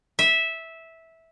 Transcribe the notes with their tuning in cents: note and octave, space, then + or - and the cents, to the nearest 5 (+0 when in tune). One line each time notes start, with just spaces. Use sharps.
E5 -10